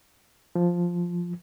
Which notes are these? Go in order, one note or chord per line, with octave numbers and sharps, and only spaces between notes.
F3